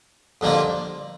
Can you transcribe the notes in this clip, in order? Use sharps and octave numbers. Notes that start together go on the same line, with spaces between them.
F2 D3 G3 A#3 F4